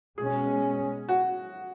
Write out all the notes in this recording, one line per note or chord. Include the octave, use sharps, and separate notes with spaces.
B2 G#3 C#4 G#4
F#4